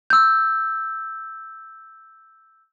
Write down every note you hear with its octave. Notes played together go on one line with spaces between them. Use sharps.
E6 G6